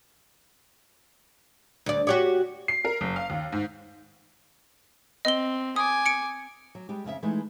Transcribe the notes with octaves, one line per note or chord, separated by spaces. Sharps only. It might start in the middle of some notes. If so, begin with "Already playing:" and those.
D2 D5
F#4 G4 C#5
C7
A#4
F#1
F5
D#2
G#2
C4 D#5 G7
G#5 D6 D#6
C#7 D7
F#3
G3 G#3 G4
F2 C#3 F4 E5
E3 G#3 A3 D#4 E4